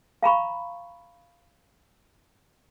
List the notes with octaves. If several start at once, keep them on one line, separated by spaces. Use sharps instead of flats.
F5 A#5 B5 C#6